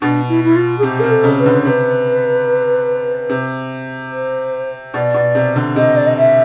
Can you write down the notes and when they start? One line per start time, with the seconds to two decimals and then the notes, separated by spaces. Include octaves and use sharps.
0.02 B2 D4
0.29 E4
0.44 E4
0.56 F4
0.78 G#4
0.83 C3 G4
1.00 C3 A#4
1.11 A4
1.24 C#3
1.39 B4
1.46 D3
1.65 C3 B4
3.30 C3
4.12 C5
4.94 B2 D5
5.14 B2
5.35 C3
5.56 D3
5.76 C3 D#5
5.96 D5
6.06 D#5
6.17 E5